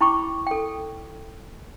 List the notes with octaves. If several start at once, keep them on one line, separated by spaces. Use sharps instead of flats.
E4 G5 B5 C#6 D6
A4 G5